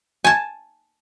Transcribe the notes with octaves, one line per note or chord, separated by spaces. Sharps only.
G#5 A5